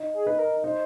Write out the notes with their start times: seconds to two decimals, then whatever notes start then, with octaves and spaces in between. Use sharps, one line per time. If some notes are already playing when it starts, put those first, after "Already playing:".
Already playing: D#4
0.14 G#4
0.26 D#4 B4
0.39 A#4
0.64 D#4 C5